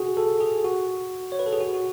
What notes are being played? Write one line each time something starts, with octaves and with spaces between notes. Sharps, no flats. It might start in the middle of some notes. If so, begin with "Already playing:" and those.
Already playing: F#4 G#4
A4
G#4
F#4
C#5
B4
A4
G#4
F#4
F#4